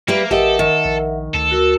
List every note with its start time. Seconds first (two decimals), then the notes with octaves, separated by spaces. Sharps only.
0.08 G3 A#3 B4 E5
0.31 A1 G4 A4 A#4 D#5 E5 F#5
0.59 D#3
0.85 A#1
1.34 D2 A4
1.51 F#4 A#4 E6